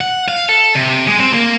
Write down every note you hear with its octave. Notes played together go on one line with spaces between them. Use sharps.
F#5
F5
A4
C3
G#3
C4
A#3